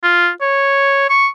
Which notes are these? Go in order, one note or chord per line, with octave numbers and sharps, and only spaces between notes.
F4
C#5
C#6